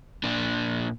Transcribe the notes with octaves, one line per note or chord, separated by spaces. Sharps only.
A#2 D4